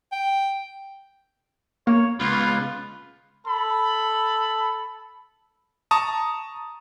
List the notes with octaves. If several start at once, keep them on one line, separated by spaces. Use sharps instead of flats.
G5
A#3 C#5
C#2 B3 F4
A4 B5
A5 A#5 C#6 D#6